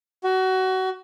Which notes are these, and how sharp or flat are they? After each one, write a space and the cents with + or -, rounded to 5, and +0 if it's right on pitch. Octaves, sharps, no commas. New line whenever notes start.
F#4 +25